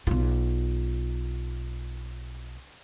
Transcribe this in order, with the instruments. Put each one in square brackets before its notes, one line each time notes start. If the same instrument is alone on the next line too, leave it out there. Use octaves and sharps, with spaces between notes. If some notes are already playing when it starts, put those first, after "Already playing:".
[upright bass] B1 F4